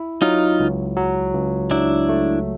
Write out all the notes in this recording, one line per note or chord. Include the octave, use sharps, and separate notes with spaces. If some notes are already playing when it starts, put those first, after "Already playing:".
Already playing: E4
F#3 D#4 F4
C#2
F#3
C#2
F#3 D4 E4
A3